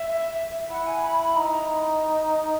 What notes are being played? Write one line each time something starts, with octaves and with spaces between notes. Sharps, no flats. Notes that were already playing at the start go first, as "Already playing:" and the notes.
Already playing: E5
E4 F#5
G#5
B5
B5
D#4 A#5